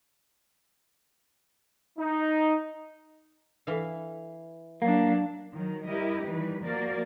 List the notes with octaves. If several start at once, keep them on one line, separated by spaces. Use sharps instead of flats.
D#4
E3 F5
F#3 A#3 D4
D#3 F#3
G3 E4 G4 A#4 D#5
D#3 E3 G3 B4
F3 A#3 F#4 A#4 D5